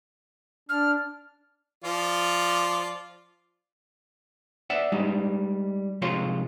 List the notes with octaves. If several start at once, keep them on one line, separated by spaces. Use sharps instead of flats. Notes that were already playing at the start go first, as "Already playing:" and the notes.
D4 F6
F3 F4 D5
D5 E5 F#5
G3 G#3 D#4
C3 F3 G#3 F4 C#5 C6